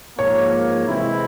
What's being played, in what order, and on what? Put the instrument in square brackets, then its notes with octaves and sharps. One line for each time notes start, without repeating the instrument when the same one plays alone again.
[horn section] G#2 F3 A#3 [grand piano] C#5
[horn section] C3 E3 G#3 C4 E4